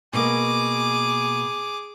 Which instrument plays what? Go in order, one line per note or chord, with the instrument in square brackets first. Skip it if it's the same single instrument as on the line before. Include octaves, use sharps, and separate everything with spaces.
[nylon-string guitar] B2 A#3 [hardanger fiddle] G#4 D6